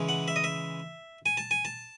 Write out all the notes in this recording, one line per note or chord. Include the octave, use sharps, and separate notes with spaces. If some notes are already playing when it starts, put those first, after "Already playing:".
Already playing: C#3 E3 G#3
F#5
E5
D#5
E5
G#5
A5
G#5
A5